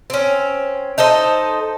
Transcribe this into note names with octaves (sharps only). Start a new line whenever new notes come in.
C4 C#4
D#4 A4 C5 D#5